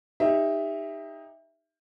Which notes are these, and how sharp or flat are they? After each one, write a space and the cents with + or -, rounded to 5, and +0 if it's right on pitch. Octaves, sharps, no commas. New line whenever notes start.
D#4 +0 G4 +30 E5 +5